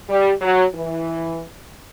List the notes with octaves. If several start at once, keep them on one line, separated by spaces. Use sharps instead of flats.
G3
F#3
E3